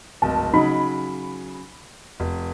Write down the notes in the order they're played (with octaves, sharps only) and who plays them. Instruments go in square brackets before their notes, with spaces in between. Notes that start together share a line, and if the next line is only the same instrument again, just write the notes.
[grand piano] D1 G#1 D#5 [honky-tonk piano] A5
[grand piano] C#3 F#3 [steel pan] D#4 [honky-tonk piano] B5
[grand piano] F1